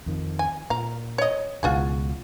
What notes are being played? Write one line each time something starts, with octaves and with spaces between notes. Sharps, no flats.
F2 D#3 F3
G#5
A#2 F5 A#5
C#5 D#5
C#2 B2 E3 F4 F#4 G#4